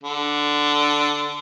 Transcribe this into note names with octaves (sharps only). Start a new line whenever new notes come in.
D3